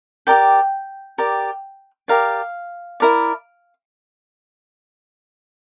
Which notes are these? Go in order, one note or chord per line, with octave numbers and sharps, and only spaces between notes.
G4 A#4 D5 G5
G4 A#4 D5
G4 A#4 D5 F5
E4 A#4 D5